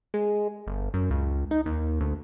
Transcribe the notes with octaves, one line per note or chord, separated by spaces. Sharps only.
G#3
G1
F#2
C#2
D#4
D#2
D2